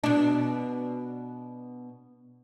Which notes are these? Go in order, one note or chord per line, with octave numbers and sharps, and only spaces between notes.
B2 D4